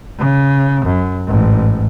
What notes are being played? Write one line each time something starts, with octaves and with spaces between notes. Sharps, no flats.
C#3
F#2
A1 G#2